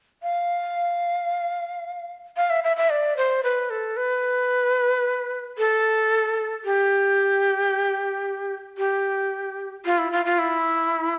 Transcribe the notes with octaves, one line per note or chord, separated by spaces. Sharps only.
F5
F5
E5
E5
E5
D5
C5
B4
A4
B4
A4
G4
G4
F4
E4
F4
F4
E4